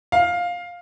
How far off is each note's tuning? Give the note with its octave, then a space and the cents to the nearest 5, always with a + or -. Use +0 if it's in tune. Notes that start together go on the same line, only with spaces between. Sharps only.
F5 +10